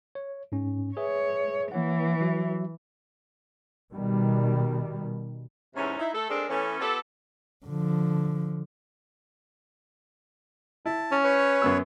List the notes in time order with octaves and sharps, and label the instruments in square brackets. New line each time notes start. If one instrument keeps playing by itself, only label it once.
[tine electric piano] C#5
G#2 C#4
[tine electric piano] G#4 B4 E5 [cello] C#5
[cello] E3 [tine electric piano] A#3 C#5 F#5
[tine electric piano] F#3 F#4 E5
[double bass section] B2 D#3 G3
[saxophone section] E2 G#2 C3 E3 C#4
D#4 E4
A3 A4
G#3 A3 C4 D4 G#4 A#4
E3 A3 B3 C#4
B3 F4 G4 A4
[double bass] D3 F3
[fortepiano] E4 [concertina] A5
[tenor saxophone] C#4
[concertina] B4 C#5
[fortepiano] F#2 B3 E6